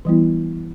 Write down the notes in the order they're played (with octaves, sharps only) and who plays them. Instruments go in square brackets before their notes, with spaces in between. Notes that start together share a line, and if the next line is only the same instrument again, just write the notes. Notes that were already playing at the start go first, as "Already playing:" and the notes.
[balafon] E3 G3 B3 E4